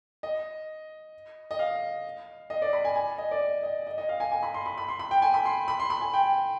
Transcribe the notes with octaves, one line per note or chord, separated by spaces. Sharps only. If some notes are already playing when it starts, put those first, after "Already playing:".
D#5
D#5
F5
D#5
D5
B5
G#5
G#5
D#5
D5
D#5
D#5
D#5
D#5
F5
G#5
G#5
B5
C6
B5
B5
C6
B5
G5
G#5
B5
C6
B5
C6
B5
G#5
G5